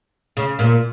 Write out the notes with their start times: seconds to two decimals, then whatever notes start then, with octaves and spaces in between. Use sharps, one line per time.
0.37 C#3
0.59 A#2